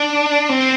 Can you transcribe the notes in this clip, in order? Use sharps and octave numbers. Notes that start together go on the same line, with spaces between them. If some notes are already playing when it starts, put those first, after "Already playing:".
Already playing: D4
C4